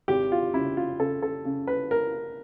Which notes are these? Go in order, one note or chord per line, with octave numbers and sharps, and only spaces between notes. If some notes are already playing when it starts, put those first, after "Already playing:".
G#1 G4
F4
C#3 E4
F4
C#3 A4
A4
C#3
B4
A#4